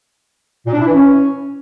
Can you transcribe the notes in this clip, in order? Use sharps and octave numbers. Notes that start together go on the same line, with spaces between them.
A#2
D4
E4
E3
C#4